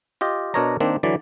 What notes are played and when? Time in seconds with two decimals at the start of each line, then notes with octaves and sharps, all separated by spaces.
0.21 F4 G4 D#5
0.54 B2 D4 A#4 C#5 D#5 A#5
0.80 D#3 A#3 C4 D4
1.03 D3 E3 F#3 D5